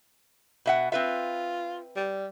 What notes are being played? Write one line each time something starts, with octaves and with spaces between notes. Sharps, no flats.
B2 E5 F#5
C4 F4 B4 E5
G3